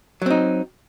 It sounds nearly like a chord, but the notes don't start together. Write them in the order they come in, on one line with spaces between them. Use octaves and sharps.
F#3 C4 D#4